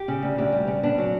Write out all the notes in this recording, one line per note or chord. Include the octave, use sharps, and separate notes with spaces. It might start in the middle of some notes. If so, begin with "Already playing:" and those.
Already playing: G4
C#3
D2
D2 G4
G3
C#3
B3 D4
F#3